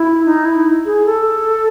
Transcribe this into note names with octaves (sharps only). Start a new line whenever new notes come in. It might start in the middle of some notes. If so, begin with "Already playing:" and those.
Already playing: E4
D#4
E4
G#4
A4